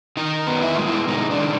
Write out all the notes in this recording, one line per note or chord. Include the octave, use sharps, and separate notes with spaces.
D#3 D#4
B3
E4
G#3 F4
E4
C3 D#4
D4
D#3